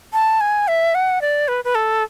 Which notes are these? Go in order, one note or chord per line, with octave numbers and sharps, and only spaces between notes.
A5
G#5
E5
F#5
D5
B4
B4
A4